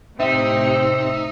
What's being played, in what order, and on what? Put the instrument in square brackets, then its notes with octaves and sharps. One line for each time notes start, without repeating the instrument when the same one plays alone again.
[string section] A2 C3 [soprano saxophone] C4 [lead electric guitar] D#4 [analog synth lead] E5